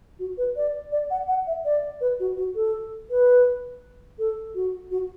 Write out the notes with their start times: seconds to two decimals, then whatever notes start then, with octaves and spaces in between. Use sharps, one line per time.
0.19 F#4
0.38 B4
0.56 D5
0.92 D5
1.10 F#5
1.28 F#5
1.47 E5
1.65 D5
2.01 B4
2.20 F#4
2.37 F#4
2.55 A4
3.10 B4
4.19 A4
4.55 F#4
4.91 F#4